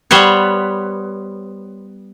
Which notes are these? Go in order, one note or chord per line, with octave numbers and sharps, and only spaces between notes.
G3 B3 C5 C#5